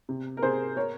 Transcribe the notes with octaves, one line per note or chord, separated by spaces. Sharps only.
C3
A#4
C3 G#4 C5
A#4 C#5